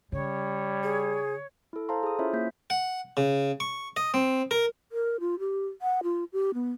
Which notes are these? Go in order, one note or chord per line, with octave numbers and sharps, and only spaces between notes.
C#3 G3 C#5
G#4
E4 A4
A4 C5 F5 A5 A#5 C6
G#4 D#6
C#4 E4 F4 C5 C#5 E5
A#3 E5 G6 B6
F#5
C#3
C#6
D#5
C4
A#4
A#4
F4
G4
F#5
F4
G4
B3